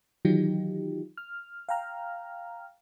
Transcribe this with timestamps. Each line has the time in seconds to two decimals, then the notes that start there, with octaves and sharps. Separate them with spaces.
0.25 D#3 E3 F#3 D#4 F4 G4
1.17 F6
1.69 F5 G5 A#5 F6